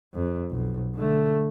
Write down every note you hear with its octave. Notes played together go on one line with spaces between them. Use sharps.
F2
B1
D3 A3